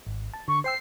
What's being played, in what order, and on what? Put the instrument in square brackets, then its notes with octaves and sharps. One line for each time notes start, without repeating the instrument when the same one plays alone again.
[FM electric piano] G#1
A5
[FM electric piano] D3 [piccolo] C#6
[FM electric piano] C5 G5 E6 [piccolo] C7